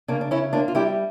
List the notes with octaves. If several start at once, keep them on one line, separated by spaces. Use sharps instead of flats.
C#3 A#3 D4
D4
C#3 C#4 E4
A#3 D4 F4
F4
G3 E4 G4